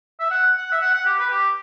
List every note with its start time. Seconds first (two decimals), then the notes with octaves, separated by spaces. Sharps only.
0.20 E5
0.31 F#5
0.56 F#5
0.72 E5
0.81 F#5
0.94 F#5
1.06 G4
1.19 B4
1.30 G4